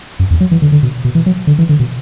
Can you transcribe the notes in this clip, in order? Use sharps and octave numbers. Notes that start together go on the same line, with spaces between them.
F#2
E2
F#3
E3
D3
D3
B2
B2
E3
F#3
D3
E3
D3
B2